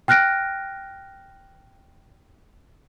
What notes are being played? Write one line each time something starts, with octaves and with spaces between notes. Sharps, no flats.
G5 F6 F#6 A#6 D7